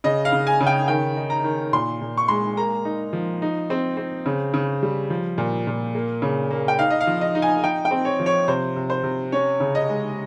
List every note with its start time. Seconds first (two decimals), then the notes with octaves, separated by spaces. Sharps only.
0.04 C#3 D#5
0.25 F5
0.32 C#3
0.47 G#5
0.61 C#3
0.67 G5
0.88 D#3 G5
1.17 D#4
1.30 A#5
1.44 D#3
1.73 A#2 C6
2.01 A#2
2.17 C#6
2.28 G#3 C6
2.57 A#3 A#5
2.85 D#4
3.13 F3
3.42 D#4
3.70 C4
3.97 C4
4.26 C#3
4.54 C#3
4.83 G3
5.10 F3
5.38 A#2
5.67 A#2
5.95 A#3
6.22 C#3
6.51 A#3
6.68 G5
6.79 D#4 F5
6.91 D#5
7.01 F5
7.07 F3
7.21 D#5
7.35 D#4
7.42 G#5
7.63 D#4 G5
7.85 G5
7.91 C4
8.05 C#5
8.20 F3
8.26 C#5
8.48 C3 C5
8.76 C3
8.90 C5
9.03 C3
9.32 C#4 C#5
9.60 C#3
9.75 D#5
9.89 G#3